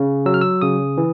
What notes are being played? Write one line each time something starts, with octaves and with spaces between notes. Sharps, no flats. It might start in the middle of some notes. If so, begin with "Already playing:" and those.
Already playing: C#3
F#3 E6
F6
E6
C#3 D#6
E3